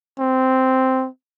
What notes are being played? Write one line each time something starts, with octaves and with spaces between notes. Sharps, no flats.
C4